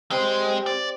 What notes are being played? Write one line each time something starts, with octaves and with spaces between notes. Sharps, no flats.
G3 G#3 C4
D5